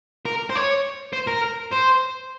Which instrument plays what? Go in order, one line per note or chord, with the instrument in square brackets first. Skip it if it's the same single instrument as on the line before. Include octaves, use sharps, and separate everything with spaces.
[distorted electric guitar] A#4
C5
C#5
C5
A#4
C5